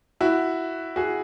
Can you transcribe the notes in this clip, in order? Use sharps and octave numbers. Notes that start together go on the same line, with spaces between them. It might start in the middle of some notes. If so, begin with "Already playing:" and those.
E4 F#4
F#4 G#4